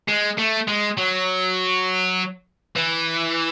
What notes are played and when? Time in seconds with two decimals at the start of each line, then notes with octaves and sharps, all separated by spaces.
0.08 G#3
0.38 A3
0.68 G#3
0.97 F#3
2.76 E3